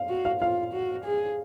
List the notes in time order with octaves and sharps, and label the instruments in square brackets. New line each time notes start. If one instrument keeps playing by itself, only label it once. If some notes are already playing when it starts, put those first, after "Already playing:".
Already playing: [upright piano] F5
[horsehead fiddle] F#4
[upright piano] F5
[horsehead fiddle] F4 [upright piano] F5
[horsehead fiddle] F#4
G#4